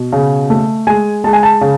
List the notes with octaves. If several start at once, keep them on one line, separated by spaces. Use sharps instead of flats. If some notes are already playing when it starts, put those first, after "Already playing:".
Already playing: B2
C#3
A3
G#3 G#5
G#3 A5
G#5
A5
C#3